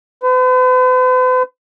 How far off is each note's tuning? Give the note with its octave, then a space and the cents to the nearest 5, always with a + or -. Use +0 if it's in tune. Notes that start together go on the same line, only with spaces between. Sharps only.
B4 +45